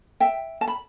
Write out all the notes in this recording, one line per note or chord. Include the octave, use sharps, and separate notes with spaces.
E5 G5
A5
B5